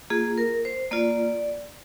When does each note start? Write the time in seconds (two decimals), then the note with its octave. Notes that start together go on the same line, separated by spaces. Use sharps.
0.10 A#3 F4 G#4
0.38 A#4
0.65 C5
0.91 A#3 F4 D5